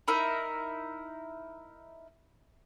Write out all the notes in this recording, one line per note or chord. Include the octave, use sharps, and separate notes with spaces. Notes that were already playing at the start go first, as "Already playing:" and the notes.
D#4 E4 A#4 E5